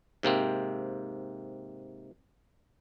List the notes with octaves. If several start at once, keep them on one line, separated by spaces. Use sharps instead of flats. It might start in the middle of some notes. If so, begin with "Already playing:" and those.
G#2 C3 A#3 C4